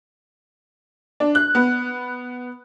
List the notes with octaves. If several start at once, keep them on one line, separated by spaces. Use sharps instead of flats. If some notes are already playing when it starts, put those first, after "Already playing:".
D4
F#6
B3